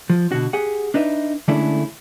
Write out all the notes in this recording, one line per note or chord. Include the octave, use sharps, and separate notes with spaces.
F3
B2 D3 F#4
G4 G#4 F#5
D4 D#4 B4 E5
D3 G#3 A3 C#4 D4 E4